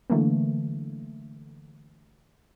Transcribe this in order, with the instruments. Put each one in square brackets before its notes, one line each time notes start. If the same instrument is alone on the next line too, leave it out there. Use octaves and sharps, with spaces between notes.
[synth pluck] D3 E3 F#3 A3 A#3